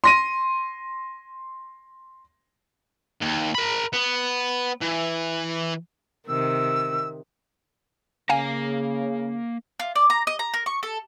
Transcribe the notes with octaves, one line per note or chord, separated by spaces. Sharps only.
C6 A#6 D#7
D#2
A#4 B5
B3
E3
C3 D#3 E6
C#3 A#3 F5 G#5 A#5
F4
D5
A#5
D#5
A#5
A#4
C#6
A4